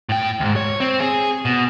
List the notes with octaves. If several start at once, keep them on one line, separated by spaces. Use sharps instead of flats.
A2 G5
D2 G#2
C#5
C4
G#4
B2